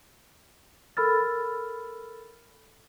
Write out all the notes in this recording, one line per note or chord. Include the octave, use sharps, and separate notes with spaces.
A4 A#4 B5 E6 F6 A6